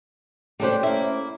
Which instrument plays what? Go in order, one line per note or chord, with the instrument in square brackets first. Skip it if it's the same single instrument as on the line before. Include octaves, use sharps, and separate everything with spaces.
[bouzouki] G3 D4 G4 [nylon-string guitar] A3 C#4 C5
[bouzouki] A#3 E4